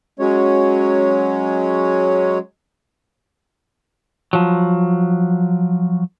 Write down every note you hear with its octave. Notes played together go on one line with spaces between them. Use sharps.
F#3 G#3 C#4 C#5
F3 F#3